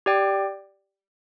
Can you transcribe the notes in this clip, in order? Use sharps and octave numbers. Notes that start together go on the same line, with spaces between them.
G4 D5 G5